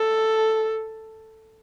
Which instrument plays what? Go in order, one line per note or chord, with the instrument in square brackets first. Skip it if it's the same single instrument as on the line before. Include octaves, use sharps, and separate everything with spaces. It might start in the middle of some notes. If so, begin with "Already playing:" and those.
Already playing: [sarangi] A4